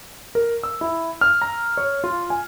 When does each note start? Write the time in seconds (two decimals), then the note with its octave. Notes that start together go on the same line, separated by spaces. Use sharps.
0.35 A#4
0.63 E6
0.81 E4
1.21 F6
1.42 A#5
1.77 C#5
2.04 F4
2.30 G#5